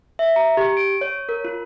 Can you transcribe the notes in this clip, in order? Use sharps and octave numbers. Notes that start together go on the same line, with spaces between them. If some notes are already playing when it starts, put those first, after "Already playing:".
E5
A#5
G4
D7
C#5
A#4
F4